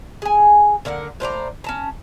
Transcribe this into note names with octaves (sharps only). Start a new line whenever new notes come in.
G#4 G#5
D3 A#3 A#4 F#5
A2 C5 D5 A#5
C#4 A5 A#5